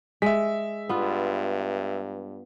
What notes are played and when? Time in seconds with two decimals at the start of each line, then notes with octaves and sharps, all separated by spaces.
0.22 G#3 E5 B6
0.89 G2 B3 F4